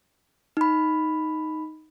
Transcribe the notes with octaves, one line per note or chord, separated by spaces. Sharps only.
D#4 B5